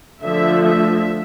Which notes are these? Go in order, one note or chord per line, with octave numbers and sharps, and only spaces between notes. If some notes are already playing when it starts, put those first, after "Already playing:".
D3 F3 A3 E5
E5